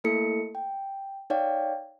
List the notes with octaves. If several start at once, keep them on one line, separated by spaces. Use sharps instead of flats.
A3 A#3 E4 A4 C#7
G5
D#4 C#5 D5 F5 G5